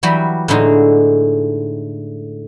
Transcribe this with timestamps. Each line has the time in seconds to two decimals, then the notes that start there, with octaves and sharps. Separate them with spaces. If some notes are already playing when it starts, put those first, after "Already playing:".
0.03 E3 F#3 G3 F#4 G4 B4
0.48 A2 D3 G#3 D#4 F#4 G#4